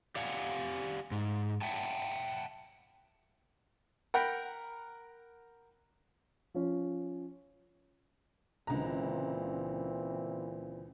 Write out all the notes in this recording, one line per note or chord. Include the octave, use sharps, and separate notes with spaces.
G4 D5 F5 F#5 G#5
G#2
E5 F#5 G5 A5
A#4 F#5 G5 A#5 B5
F3 C#4
C#2 A#2 D3 E3 C4 A#5